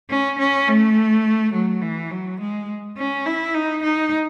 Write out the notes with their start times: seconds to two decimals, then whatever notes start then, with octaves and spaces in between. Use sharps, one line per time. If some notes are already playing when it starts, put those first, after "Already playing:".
0.10 C#4
0.39 C#4
0.68 A3
1.54 F#3
1.82 E3
2.11 F#3
2.40 G#3
2.97 C#4
3.26 E4
3.55 D#4
3.83 D#4